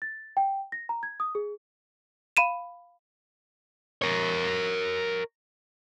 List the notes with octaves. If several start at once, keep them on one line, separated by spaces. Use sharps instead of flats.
A6
G5
A#6
A#5
G#6
D#6
G#4
F5 B5 D#7 E7
A#4 C#5